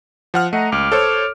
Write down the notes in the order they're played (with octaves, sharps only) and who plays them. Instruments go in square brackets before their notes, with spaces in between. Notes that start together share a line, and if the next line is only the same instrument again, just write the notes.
[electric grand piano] F3 F#5 F6
[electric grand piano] A3 [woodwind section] D#5 F#5 A#5
[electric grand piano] C#2 [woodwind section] D6 F6
[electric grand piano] A4 C5 C#5